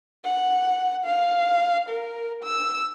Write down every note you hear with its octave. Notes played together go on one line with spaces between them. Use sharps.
F#5
F5
A#4
E6